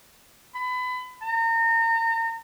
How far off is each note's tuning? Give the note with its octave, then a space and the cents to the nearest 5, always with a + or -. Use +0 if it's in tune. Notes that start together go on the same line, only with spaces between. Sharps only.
B5 +25
A#5 -35